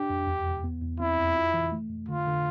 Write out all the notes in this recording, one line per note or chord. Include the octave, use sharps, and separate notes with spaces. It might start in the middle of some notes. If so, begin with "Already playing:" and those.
Already playing: D4 G4
F2
E2
E2
B3
E2
C4 E4
F2
F4
E3
A3
F2
D3 F4
D3